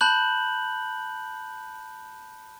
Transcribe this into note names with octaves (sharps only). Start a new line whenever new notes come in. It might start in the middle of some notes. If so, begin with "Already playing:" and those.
A5 B5 F#6 G6 F#7